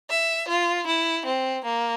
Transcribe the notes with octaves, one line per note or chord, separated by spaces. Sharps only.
E5
F4
E4
C4
A#3